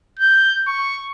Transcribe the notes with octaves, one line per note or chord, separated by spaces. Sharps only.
G6
C#6